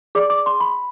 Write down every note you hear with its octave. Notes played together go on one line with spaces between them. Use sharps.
G#4 D5 D6
D6
C6
B5